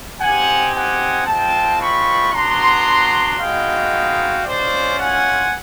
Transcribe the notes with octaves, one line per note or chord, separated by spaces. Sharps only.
C4 D#4 G4 F#5 G#5
F#5 G#5
G#3 C4 F4 G5 A5
B5 C#6
B3 D4 F#4 A#5 C6
G#3 B3 D#4 F#4 F5 G5
G#3 C#4 F4 C5 D5
F#5 G#5